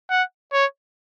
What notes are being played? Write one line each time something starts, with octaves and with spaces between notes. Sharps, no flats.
F#5
C#5